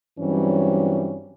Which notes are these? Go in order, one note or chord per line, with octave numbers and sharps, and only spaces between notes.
G2 E3 F#3 G3 C4 C#4